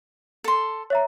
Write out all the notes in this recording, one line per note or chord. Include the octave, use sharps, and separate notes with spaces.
A4 C6
C#5 E5 A#5